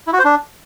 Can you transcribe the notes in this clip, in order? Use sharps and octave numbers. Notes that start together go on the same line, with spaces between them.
E4
F#4
C5
D4